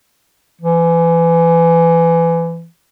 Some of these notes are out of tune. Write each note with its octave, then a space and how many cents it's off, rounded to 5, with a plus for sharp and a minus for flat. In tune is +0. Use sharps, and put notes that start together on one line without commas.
E3 +25